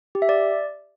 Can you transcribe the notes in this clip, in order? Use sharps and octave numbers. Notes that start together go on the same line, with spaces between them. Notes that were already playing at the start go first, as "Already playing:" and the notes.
G4
E5
D5